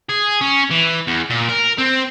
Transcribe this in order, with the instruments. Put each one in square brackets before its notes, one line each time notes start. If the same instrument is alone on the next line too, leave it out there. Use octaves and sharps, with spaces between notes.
[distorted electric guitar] G#4
C#4
E3
E2
A#2
A#4
C4